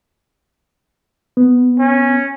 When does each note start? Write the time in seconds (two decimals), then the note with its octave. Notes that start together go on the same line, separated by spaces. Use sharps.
1.37 B3
1.79 C#4